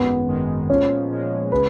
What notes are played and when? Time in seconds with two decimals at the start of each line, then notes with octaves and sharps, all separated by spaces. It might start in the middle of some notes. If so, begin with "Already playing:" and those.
Already playing: G#1 F#2 D#3 G#3 B3
0.28 G#1 F#2 D#3 G#3
0.70 A#2 F3 G#3 C#4
1.10 A#2 F3 G#3
1.52 C#3 G#3 B4